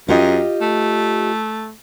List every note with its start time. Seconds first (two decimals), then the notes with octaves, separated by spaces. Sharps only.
0.09 F#2 F4 G4 D#5
0.61 A3